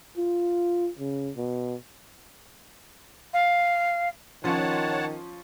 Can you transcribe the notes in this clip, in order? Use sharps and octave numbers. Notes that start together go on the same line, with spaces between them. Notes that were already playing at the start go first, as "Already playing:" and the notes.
F4
C#3
B2
F5
D#3 F3 C#4 F4 C#5 F#5 A5